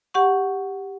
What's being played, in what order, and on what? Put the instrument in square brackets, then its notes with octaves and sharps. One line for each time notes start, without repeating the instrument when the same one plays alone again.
[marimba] G4 F#5 C#6